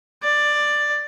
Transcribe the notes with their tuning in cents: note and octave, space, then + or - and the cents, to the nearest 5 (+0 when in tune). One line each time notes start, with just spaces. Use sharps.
D5 +10